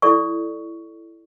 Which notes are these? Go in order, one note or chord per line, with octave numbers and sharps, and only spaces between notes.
E4 A4 D5 C#6